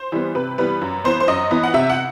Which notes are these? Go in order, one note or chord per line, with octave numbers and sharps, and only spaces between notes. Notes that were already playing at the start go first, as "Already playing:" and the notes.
Already playing: C5
E3 G3 B3
C3 B4
E3 G3 B3 B4
F#2
E3 B3 C5
C5
F#2 D#5
E3 B3
F#5
C3 E5
F#5